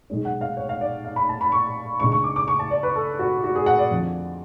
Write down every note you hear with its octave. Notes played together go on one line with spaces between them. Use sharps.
B1 B2 G#3 C#4
F#5
F5
C#5
F5
D5
F5
B5
A5
B5
C#6
C#2 C#3 G#3 D4 C#6
C#6
D6
D6
C#6
A5
D5
B4
A4
F#4
F#4
G#4
F#5
D5
F2 D3 F3